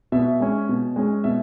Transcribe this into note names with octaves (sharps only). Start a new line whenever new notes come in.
B2 E5
G#3 C#4
B2
G#3 C#4
B2 E5